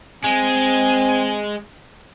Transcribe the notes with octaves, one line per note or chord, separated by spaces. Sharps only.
G#3 C4 G#5